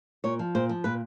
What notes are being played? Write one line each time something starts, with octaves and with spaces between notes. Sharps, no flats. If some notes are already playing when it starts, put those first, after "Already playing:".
A#2 C#5
F3
A#2 C5
F3
A#2 B4